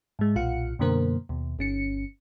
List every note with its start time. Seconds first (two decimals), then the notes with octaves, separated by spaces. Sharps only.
0.19 G#2 G#3
0.35 B1 A#2 F4 F5 F#5 C#7
0.79 F#2 B2 D3 A#3 A#4 C5
1.29 D#2 B2
1.59 G1 C#4 C#7